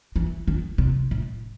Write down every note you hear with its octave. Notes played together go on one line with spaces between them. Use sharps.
E3
D#3
C3
A2